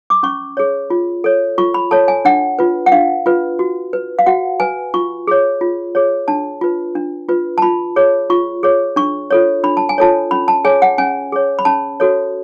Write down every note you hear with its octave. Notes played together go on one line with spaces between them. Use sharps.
D6
C#4 C#6
G#4 C#5
F4
A4 C#5
F4 C#6
B5
A4 C#5 A5
G#5
D4 F#5
F4 B4
F#5
D4 F5
F4 B4
F#4
B4
F5
F#4 F#5
B4 G#5
F4 C#6
G#4 C#5
F4
G#4 C#5
D4 A5
F4 B4
D4
F4 B4
A5
F4 B5
G#4 C#5
F4 C#6
G#4 C#5
D4 C#6
F4 A4 C#5
D4 B5
A5
G#5
F4 A4 C#5 A5
C#4 B5
A5
G#4 C#5 G#5
F#5
C#4 G#5
G#4 C#5
B5
C#4 A5
F#4 A4 C#5